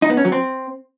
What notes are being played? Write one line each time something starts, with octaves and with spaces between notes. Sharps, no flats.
D#4
B3
C#4
F#3
C4